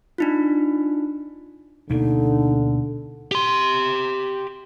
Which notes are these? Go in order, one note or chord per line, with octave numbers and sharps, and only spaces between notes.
D4 D#4 F4
D2 B2 D3 A#3 D#4
G4 C6